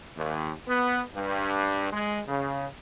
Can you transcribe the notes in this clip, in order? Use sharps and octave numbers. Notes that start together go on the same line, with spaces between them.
D#2
B3
G2
G#3
C#3